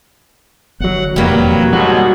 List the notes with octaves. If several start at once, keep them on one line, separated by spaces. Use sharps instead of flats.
G1 F#3 F#5
E1 F2 D#3 F#3 G3 A#3 B4
G#2 B2 F#3 G3 F#4